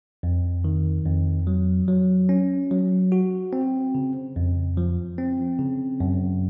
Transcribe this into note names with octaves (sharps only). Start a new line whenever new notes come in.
F2
D#3
F2
F#3
F#3
C#4
F#3
F#4
C4
C#3
F2
F3
C4
C#3
F#2